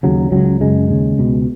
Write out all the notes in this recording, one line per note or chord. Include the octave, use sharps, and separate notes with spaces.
D#2 C#3 F#3
C#2 C#3 F#3
F#2 C#3 G#3
D#2 C#3
C#2 B2